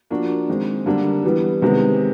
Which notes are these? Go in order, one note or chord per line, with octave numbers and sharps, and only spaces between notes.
F3 A#3 D4 F#4
D#3 G#3 C4
D3 G3 A#3 D4
E3 G3 B3
C3 D#3 G#3 B3